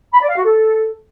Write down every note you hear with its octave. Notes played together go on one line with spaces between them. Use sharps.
B5
D5
F5
F#4
A4